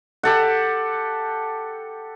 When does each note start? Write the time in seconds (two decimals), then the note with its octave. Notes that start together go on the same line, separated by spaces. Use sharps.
0.23 G4 A4 F#5